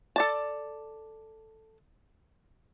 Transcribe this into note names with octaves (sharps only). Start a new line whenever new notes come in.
A4 D5 A5